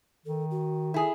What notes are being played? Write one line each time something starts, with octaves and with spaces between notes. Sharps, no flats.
D#3 A4
F#4
E4 G#4 A4